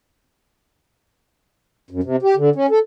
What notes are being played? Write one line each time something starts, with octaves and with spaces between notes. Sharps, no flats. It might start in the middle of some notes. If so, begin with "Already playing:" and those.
F#2
C3
G4
D3
C#4
A4